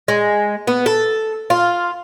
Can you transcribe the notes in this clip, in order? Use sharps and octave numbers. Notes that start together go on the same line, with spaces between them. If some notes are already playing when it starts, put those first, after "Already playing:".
G#3
B3
A4
F4